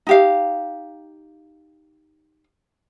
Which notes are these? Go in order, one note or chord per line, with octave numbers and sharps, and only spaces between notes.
D#4 G4 F5